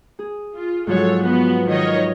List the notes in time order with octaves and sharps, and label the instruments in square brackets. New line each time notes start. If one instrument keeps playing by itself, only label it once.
[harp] G#4
[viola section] F4
[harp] G#2 F3 F#3 [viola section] A4 C#5
[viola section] B3 F#4 [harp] B4
[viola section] D#3 C#5 D#5